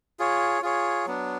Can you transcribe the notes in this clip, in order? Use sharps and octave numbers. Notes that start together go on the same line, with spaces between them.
F4 G#4 C#5
F4 G#4 C#5
F#3 B3 D4